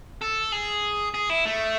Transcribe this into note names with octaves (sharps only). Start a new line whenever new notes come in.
A4
G#4
G#4
E4
A3